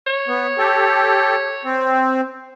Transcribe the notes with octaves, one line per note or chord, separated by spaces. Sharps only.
C#5
B3
G4 A4
C4